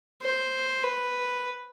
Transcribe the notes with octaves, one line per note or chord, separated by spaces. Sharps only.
C5
B4